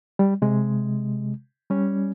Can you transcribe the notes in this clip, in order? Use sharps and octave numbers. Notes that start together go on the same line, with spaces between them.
G3
C3 G#3
G3 C#4